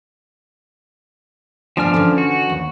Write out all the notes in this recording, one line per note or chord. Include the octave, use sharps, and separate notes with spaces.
F3 B3 D4 G#5 F6
D3 E3 C#4
F#4
D#2